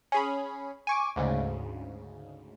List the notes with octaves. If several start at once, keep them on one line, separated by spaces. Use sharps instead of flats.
C#4 G#4 B5
G#5 C#6 D6
D2 G#2 C#3